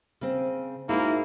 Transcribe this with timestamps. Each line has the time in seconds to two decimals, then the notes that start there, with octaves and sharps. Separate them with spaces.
0.21 C#3 C4
0.89 G#2 A#3 E4 F#4